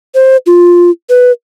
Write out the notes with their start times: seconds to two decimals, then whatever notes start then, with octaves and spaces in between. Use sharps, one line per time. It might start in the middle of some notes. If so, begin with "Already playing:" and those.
0.15 C5
0.46 F4
1.10 B4